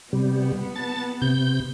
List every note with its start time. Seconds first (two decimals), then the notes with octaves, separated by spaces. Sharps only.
0.13 C3 G3 B3
0.76 A5 A6
1.22 C3 G6